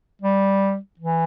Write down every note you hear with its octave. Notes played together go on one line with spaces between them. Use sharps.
G3
E3